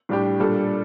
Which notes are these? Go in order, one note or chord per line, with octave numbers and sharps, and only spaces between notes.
A2 G3 D4 G4
A#2 G3 D4 A4